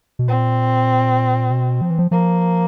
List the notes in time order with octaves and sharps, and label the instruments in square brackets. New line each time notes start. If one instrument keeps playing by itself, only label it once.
[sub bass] B2
[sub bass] A#2 [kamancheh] C4
[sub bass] B2
F3
E3
F3
[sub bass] F3 [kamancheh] A#3